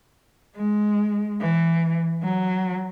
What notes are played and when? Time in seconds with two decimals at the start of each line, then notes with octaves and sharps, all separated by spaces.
0.56 G#3
1.41 E3
2.23 F#3